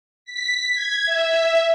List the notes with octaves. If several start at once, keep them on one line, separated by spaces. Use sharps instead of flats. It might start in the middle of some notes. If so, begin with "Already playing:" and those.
B6
G#6
E5